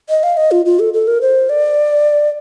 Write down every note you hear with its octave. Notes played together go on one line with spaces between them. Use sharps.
D#5
F5
D#5
F4
F4
A4
A4
A#4
C5
D5